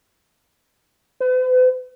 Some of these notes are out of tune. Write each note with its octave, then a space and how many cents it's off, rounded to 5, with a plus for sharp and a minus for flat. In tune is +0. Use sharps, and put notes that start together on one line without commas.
B4 +45